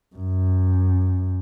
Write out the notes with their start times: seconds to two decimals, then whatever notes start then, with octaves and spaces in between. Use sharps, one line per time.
0.15 F#2